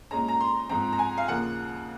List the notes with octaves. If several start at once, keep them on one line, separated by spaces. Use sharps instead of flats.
A#2 G#3 C#4 A#5
A#5
C6
G#2 F3 C4 A#5
A#5
G#5
F5
D#2 C#3 F3 A#3 F#5